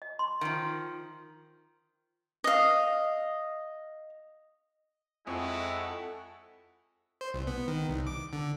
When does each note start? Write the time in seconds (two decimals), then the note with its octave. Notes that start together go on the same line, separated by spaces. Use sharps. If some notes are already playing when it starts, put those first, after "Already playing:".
0.02 D#5
0.19 C6
0.41 D#3 F3
2.44 D#5 F5
5.27 F2 G#3 E4 A4 F#5 C#6
7.21 C5
7.34 C2
7.47 B3
7.68 D#3
7.89 C2
8.07 D6
8.33 D3